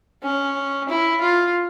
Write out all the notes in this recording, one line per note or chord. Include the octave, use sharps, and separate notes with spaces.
C#4
E4
F4